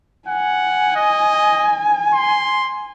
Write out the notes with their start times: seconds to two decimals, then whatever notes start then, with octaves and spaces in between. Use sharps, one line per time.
0.28 F#5 G#5
0.96 D#5
2.14 C6